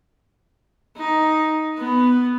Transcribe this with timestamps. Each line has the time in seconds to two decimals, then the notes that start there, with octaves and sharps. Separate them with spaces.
0.97 D#4
1.78 B3